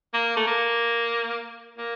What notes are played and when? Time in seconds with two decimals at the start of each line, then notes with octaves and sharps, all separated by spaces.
0.14 A#3
0.37 A3
0.47 A#3
1.78 A#3